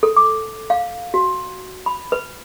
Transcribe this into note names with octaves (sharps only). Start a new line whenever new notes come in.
A4
D6
F5
F#4
B5
B4